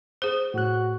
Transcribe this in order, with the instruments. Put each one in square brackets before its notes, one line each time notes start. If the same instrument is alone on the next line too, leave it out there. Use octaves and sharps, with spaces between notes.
[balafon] G#4 C5
[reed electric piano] A2 F#6 [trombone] F#4